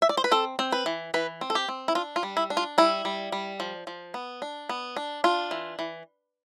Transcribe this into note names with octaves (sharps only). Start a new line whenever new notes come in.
E5
D5
C5
B4
C4 A4
C4
B4
E3
E3 B4
C4
A4
G4
C4
E4
D4 F4
F4
G3
E4
D4
F4
G3 E4
G3
G3
F3
F3
B3
D4
B3
D4
D4 F4
E3
E3